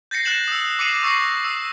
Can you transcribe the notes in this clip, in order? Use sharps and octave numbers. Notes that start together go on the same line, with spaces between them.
G6 A6 A#6 C7 C#7
F#6 G6 C#7 E7 F#7
D#6 E6
D6 D#6 C7 C#7 D#7 F#7
C#6 E6 A#6 C7 C#7
E6 C7